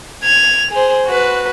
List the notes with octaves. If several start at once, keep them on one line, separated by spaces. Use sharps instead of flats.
G#6 F7
G#4 C5
F#4 B4